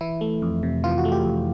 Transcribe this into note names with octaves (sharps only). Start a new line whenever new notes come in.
E3 E4
A3
F2
C3
E3 F4
F#4
A3
G4
F2